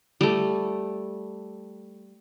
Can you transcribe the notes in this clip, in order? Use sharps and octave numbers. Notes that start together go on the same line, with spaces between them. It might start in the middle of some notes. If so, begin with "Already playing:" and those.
G3 A3